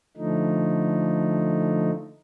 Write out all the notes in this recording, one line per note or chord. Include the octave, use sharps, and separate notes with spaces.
D3 F3 A3 D#4